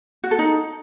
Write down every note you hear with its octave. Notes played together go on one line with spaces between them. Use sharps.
F#4
A4
D#4